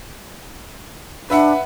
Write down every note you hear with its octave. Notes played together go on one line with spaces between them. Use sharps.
D4 B4 E5 F#5